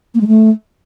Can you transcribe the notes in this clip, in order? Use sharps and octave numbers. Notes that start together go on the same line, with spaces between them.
A#3
G#3
A3